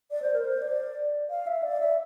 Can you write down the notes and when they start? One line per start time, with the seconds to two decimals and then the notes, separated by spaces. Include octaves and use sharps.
0.11 D5
0.22 C5
0.33 A#4
0.45 C5
0.62 D5
1.30 F5
1.47 E5
1.63 D5
1.80 E5